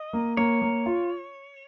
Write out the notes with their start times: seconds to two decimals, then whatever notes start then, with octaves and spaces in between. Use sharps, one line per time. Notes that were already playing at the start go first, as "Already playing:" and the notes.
Already playing: D#5
0.13 A#3
0.37 A#3 C#5
0.62 A#3
0.86 F4